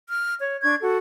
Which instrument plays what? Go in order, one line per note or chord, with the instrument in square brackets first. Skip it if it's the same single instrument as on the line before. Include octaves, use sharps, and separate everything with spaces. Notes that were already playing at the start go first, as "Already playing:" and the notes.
[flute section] F6
C#5
D4 C#6 G#6
F#4 A4